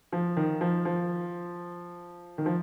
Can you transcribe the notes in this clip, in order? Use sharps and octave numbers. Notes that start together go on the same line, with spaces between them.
F3
D#3
F3
F3
D#3
F3